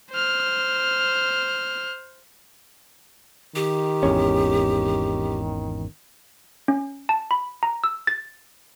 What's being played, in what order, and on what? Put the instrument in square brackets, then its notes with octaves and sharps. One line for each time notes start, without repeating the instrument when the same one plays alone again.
[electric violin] C5 F6
[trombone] D#3 [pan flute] G4
[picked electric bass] G#1 E2 C#4
[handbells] C#4
A5
B5
A#5
E6
A6